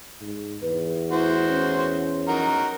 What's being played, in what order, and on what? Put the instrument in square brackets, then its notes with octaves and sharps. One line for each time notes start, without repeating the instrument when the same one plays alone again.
[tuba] G#2
[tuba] E2 [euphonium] B4
[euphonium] E4 [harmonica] F#4 C5
[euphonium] C#4
[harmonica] D#4 F#4 A#4